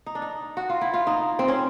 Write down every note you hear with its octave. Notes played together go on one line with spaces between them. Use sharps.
D#4
D4
D#4
F#4
F4
E4
F4
D#4
C4
C#4